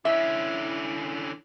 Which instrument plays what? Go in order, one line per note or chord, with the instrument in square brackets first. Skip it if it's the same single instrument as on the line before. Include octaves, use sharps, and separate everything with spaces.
[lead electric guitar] D3 C#4 [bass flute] E4 [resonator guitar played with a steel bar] E5